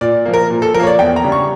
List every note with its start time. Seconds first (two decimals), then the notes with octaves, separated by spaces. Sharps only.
0.01 A#2 D5
0.25 F3 A#3
0.34 A#4
0.50 A#2
0.62 A4
0.74 F3 A#4
0.80 A#3 C#5
0.87 D5
0.99 E2 G5
1.16 A#5
1.24 C#3 G3 D4
1.32 C#6